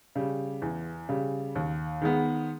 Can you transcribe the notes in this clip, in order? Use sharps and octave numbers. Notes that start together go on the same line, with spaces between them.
C#3 G3
E2
C#3 G3
D#2
D#3 G#3 B3